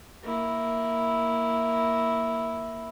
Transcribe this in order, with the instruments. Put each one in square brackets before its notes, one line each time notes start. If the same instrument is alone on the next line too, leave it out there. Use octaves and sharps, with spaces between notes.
[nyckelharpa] A#3 E4